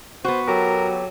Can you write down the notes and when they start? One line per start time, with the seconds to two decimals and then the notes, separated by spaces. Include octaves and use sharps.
0.25 B3 F#4 C5
0.48 F#3 G4 A4 A#4